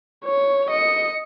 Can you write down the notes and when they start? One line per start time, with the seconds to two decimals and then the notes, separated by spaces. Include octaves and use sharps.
0.25 C#5
0.70 D#5 C#7